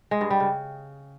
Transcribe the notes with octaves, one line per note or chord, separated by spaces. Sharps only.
G#3
G2
G3
C#3